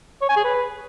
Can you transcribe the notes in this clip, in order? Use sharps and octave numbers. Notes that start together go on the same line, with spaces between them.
C#5
G#5
G#4
B4